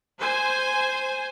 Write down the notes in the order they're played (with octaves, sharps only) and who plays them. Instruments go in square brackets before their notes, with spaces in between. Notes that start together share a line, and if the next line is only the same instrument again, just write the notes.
[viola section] C5 G#5